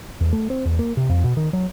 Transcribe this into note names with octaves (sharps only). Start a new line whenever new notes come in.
E2
A3
C4
E2
A#3
C3
F2
B2
D#3
F#3